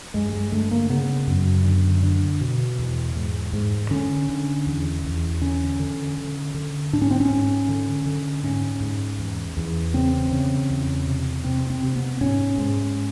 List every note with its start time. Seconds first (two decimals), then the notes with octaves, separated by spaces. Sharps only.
0.14 G2 G#3
0.33 G#3
0.52 D3 A3
0.71 A#3
0.90 C#3 B3
1.27 F#2
1.65 D3
2.03 D3
2.41 B2
2.78 E2
3.16 G#2
3.53 G#2
3.91 D3 C#4
4.29 D3
4.66 E2
5.05 E2
5.42 D3 C#4
5.80 D3
6.17 D3
6.54 D3
6.93 G#2 D4
7.02 C#4
7.11 C4
7.20 C#4
7.30 G#2
7.69 D3
8.06 D3
8.43 G#2 C#4
8.81 G#2
9.19 E2
9.57 E2
9.94 C#3 C4
10.32 C#3
10.70 E2
11.07 C3
11.44 C3 C4
11.70 C4
11.83 C3
11.96 B3
12.21 G#2 C#4
12.58 G#2